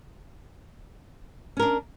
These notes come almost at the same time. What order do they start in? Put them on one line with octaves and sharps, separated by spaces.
C#4 A#4 D4